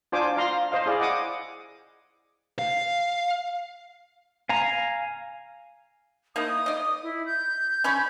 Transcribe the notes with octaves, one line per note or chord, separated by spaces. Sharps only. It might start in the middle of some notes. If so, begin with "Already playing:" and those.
D4 F4 C5 G#5 D6
F4 F5 A#5 C6
C5 D#5 F5
E4 G#4 D5 F5
D#5 F#5 D6 D#6
F5
F5 G#5 A#5
A#3 D#4 E4 D#6
D5 D#5
E4
G6
C#4 B5 C#6